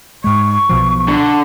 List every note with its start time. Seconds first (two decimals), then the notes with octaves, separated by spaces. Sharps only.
0.24 G#2 G#3 C#6
0.69 B1 B2 F3
1.08 D3